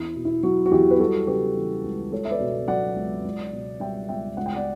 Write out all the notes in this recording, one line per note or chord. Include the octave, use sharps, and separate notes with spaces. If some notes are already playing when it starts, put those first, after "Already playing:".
Already playing: E2 E4
B2
E4
F#3 F#4
F#4
E2 E4 G4
B4
G3 F#4 A4
C#3 G4 B4
E3
C#2
C#2 A4 C#5
E5
B4 D5
B2
F#3 D5 F#5
C#2
C#2
B2
G3 E5 G5
C#2 E5 G5
C#2 F#5
G5
D5 F#5